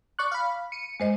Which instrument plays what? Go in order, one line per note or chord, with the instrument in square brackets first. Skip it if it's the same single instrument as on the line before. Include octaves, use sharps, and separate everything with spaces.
[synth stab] D5 C#6 F#6
F5 B5
C#7 D#7
[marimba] G#3 C5 D#5